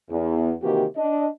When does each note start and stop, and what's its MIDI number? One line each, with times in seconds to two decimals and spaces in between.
0.11 0.52 40
0.62 0.85 48
0.62 0.85 51
0.62 0.85 52
0.62 0.85 58
0.62 0.85 66
0.62 0.85 67
0.96 1.27 62
0.96 1.27 75